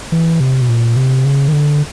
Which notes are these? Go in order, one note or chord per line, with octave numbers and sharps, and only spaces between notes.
E3
C3
B2
A#2
C3
C#3
D#3
D3